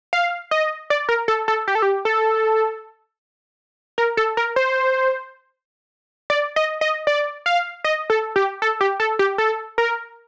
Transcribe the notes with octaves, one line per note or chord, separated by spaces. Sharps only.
F5
D#5
D5
A#4
A4
A4
G4
A4
G4
A4
A#4
A4
A#4
C5
D5
D#5
D#5
D5
F5
D#5
A4
G4
A4
G4
A4
G4
A4
A#4